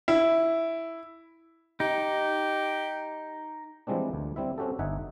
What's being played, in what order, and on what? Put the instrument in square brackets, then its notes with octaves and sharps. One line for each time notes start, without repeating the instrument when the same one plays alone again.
[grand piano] E4
[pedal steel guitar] D#4 [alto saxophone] G4
[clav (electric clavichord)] E3 F3 G3 G#3 C4 D4
D2
G3 C4 E4 E5
C4 C#4 F#4 G4 A4
G1 D#4 E5 F#5 G#5